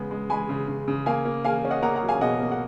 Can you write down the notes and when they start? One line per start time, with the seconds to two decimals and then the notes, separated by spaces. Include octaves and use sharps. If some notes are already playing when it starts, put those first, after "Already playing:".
Already playing: C#3 G#3 B3
0.11 G#3
0.30 G#3 G#5 B5
0.49 C#3
0.68 C#3
0.88 C#3
1.06 A#3 F5 G#5
1.25 A#3
1.45 A#3 F5 G#5
1.65 C#4
1.71 D#5 F#5
1.82 A#3 F#5 A#5
1.96 F#5 A#5
2.03 F#3
2.09 F5 G#5
2.21 B2 D#5 F#5
2.41 A#3
2.52 F#5